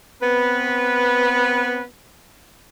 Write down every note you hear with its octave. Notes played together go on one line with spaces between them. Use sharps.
B3 C4 B4